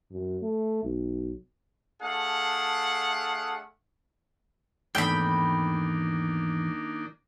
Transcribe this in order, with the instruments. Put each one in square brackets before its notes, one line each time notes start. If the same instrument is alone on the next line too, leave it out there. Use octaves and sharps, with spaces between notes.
[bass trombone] F#2
A3
B1
[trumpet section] A3 D4 G#4 F5 F#5
[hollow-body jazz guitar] E2 G#2 A3 [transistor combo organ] D#3 A#3 D4 [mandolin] G5 B5